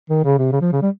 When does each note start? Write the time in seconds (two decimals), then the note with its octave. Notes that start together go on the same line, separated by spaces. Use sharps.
0.10 D#3
0.24 C#3
0.38 C3
0.52 C#3
0.61 F3
0.72 C#3
0.82 G3